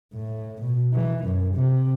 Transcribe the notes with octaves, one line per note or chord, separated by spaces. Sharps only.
A2
B2
E3
F#2
C3